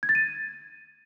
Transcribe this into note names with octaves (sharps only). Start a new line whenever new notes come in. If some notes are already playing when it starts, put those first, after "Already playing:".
G#6
A6
D#7